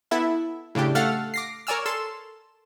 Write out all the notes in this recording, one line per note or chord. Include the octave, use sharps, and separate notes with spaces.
B3 E4 A4 E5
A2 C#3 D4 G4
A3 A4 F5 F#5 F6 A6
D6 A#6 C7
A#4 C#5 D5 G#5 E6 F6
A4 C6 E7